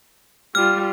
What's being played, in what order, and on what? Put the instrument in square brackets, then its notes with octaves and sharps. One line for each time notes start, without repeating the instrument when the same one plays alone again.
[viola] G3 F4 [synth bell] F6